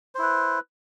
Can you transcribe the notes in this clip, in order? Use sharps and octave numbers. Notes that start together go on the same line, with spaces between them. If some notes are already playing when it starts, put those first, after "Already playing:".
E4 B4 C5